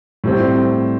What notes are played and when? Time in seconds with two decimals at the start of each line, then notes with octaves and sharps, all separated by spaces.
0.24 A2 G3 C4